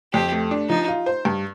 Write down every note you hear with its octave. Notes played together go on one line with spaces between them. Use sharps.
F2 G4
A3
D4
F3 D#4
F4
C5
G2